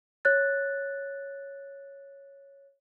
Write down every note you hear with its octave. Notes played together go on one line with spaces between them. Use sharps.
C#5 F#6 A6